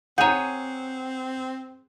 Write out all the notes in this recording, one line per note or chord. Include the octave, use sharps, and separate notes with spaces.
C4 G#4 C#5 F#5 A#5 G6 D#7